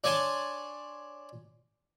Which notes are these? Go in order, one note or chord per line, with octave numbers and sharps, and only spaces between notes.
D4 C#5 D5 G#5 A5 C6